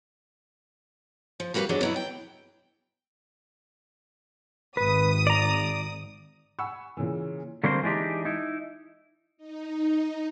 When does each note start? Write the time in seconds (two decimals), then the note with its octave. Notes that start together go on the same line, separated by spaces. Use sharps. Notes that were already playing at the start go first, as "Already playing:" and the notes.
1.40 F3
1.54 G3 A#3 F#4 G4 B4 F5
1.69 E2 G#2 F#3 G#3 D4
1.81 B2 F#3 E4
1.96 G5
4.77 G#1 B4 D#6
5.27 D5 A#5
6.59 F#5 G#5 B5 C#6 E6
6.97 A#2 C#3 E3
7.63 D3 F#3 G3 A#3 C4 C5
7.83 E3 G#3 D4 D#4 G4
8.25 D#4 E4
9.37 D#4